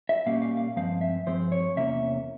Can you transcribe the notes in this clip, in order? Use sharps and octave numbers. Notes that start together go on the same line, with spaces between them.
E5
A#2 G3 A#3 C#4 F5
F5
F5
G2 F3 G#3 C4 F5
E5
G2 F3 G#3 C4 C5
C#5
E2 C3 E3 A#3 C#4 E5